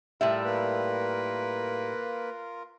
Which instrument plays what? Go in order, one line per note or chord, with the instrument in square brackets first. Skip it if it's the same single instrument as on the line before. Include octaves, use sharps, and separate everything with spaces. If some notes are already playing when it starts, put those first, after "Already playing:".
[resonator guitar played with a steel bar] A2 G3 E5 [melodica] F4 A#4
[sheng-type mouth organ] A#3 B4